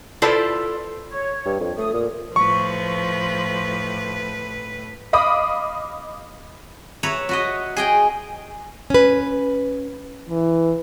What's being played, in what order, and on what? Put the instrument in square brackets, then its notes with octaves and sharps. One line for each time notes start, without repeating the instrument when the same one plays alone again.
[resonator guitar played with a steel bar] E4 F4 A4 B4 C5 D5
[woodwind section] C#5
[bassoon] G2
F2
[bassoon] A3 [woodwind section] D#6
[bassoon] A#2
[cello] A2 B4 [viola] F3 [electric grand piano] C#6
[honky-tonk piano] D#5 F5 B5 D6 D#6
[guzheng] B4 C#5 E5 A#5
F#4 B4 D#5
G#4 D#5 G5
[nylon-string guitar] C#4 B4
[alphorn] E3